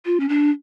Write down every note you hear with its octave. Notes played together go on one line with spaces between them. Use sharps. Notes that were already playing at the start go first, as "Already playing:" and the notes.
F4
C#4
D4